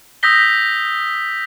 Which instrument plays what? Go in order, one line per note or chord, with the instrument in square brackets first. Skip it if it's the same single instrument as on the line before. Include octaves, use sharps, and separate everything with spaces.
[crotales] D#6 E6 G6 A#6 B6 G7